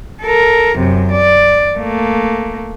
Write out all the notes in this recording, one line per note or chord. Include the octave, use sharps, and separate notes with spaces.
A4 A#4
F#2 C3
D5
A3 A#3